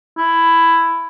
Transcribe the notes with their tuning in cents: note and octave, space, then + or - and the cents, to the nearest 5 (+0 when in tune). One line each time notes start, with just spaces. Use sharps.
E4 +10